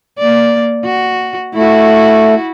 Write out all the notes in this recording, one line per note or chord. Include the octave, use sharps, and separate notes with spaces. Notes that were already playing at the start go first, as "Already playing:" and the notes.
A#3 D5
F#4
A3 E4 F#4